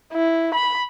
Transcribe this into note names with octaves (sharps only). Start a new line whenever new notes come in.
E4
B5